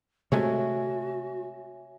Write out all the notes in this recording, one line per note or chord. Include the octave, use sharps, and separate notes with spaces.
C3 G#3 A3 F#4 C#5 E5 G#5